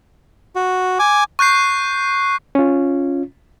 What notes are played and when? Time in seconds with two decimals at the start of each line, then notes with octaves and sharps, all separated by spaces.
0.55 F#4
0.99 G#5 D6
1.39 C#6 F#6 G6 C7
2.55 C#4 F4